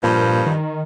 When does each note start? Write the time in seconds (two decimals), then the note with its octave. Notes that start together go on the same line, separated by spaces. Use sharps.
0.04 G2 A#2 F3
0.46 D#3